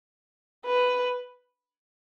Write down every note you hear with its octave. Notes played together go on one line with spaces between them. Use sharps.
B4